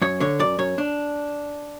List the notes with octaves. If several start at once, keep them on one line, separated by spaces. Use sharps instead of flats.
F#2 C#5
D3 C#5
F#2 D5
F#2 C#5
D4